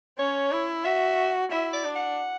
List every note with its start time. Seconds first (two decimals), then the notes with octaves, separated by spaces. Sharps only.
0.18 C#4 C#5
0.51 E4
0.85 F#4 E5
1.51 E4 E5
1.73 D5
1.84 D4
1.96 F#5